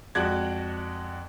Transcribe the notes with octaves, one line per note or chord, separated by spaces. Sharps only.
F2 G#3 F#4 D5 G#6